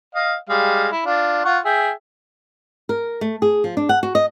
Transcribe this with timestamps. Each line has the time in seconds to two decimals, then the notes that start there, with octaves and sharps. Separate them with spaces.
0.15 D#5 F5
0.49 G3 G#3 F5
0.92 E4
1.06 D4 F4
1.45 F4 F#5 C#6
1.65 G#4 E5 G5
2.89 A#4
3.21 A3
3.42 G#4
3.64 F3
3.77 D4
3.89 F#5
4.03 F#4
4.15 D#5